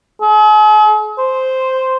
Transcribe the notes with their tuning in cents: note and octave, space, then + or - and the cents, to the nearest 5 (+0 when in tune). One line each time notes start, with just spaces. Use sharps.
G#4 +45
C5 -5